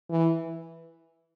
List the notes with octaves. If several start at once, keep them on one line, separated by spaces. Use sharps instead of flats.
E3